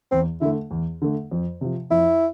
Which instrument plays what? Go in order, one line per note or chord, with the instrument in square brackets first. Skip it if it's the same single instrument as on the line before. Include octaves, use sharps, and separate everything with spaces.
[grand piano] E2 [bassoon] C4
[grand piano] D3 A3 [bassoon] E4
[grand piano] E2
D3 A3
F2
C3 F3
[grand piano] F2 [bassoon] E4